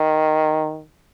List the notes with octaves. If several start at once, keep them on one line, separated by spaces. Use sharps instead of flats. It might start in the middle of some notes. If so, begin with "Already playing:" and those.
Already playing: D#3